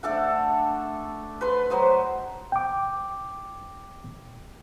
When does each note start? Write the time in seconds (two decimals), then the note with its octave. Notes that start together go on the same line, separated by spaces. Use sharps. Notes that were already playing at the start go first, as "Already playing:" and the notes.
0.03 A3 D4 A4 F#5
1.41 B4 C6
1.70 F#3 C5 D#5
2.52 G5 D6